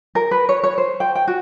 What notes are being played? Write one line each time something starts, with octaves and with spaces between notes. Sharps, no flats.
A#4
B4
C#5
C#5
C5
G5
G5
F#4